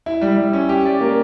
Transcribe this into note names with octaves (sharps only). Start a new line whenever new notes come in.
E4
G3
G3
C#4
G4
D5
A#3